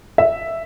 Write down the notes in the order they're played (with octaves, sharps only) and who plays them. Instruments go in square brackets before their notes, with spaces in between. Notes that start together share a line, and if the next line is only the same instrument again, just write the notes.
[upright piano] E5